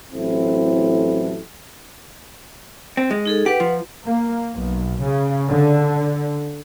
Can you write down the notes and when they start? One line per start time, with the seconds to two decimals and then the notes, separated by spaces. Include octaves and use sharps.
0.12 A1 F#3 C4 E4 A4
2.97 C4
3.11 G#3
3.26 D#4 G#4 A4
3.46 G4 B4 F#5
3.60 F3
4.06 A#3
4.54 B1
5.02 C#3
5.49 D3